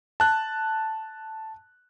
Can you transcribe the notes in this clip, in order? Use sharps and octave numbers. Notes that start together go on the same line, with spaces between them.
A5 F#6